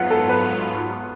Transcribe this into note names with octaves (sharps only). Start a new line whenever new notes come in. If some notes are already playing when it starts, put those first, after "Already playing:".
Already playing: G#2 F#3 B3 F4 F#5
A4
B4